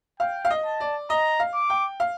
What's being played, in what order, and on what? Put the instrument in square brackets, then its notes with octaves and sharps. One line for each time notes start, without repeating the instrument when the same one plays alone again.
[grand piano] F5 [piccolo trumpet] G5
[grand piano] F5
D#5
[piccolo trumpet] A5
[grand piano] D5
[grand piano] D#5 [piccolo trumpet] A#5
[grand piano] F5
[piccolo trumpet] D6
[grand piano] G5
F5